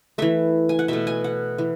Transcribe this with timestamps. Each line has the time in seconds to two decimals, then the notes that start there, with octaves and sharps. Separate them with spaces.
0.18 E3 A3 E5
0.69 G#5
0.79 F#5
0.88 B2 A3 E5
1.07 G#5
1.24 F#5
1.58 E3